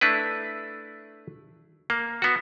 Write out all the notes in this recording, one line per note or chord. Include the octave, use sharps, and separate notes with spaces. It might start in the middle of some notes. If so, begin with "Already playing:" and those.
A3 D4 E4 B4
A#3
B3 F#4